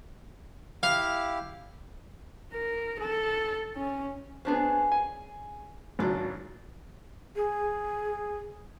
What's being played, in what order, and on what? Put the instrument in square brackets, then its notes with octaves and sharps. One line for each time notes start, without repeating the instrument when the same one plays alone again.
[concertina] E4 G4 [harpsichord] F5
[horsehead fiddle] A#4
A4
C#4
[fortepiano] B3 D4 C5 [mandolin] C#4 E4 G#4
[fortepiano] G#5
[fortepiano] G#1 C#2 F#3 [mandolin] D4 A#5
[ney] G#4